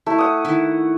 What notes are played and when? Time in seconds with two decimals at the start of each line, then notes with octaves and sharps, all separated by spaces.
0.06 A3 E4
0.18 F#5 D#6
0.45 D#3 E4